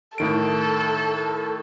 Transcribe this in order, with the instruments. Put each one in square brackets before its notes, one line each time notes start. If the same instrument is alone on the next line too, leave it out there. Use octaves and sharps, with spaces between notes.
[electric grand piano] A2 D#3 D7 [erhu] A4